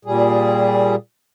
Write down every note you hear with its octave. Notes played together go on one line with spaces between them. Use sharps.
A#2 G3 G#4